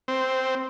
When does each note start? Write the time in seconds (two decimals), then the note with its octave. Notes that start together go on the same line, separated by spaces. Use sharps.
0.08 C4